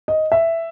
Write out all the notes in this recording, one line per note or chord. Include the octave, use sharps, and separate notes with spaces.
D#5
E5